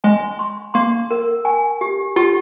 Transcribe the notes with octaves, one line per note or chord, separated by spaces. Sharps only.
G#3 G#5
C6
A#3 C6
A#4
G#5
G4
F4 G4